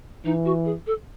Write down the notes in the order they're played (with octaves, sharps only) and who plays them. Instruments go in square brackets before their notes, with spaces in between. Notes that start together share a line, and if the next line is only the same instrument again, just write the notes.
[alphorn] E3 [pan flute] D#4
[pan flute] F#4
G#4
A4